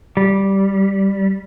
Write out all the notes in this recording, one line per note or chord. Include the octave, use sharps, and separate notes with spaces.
G3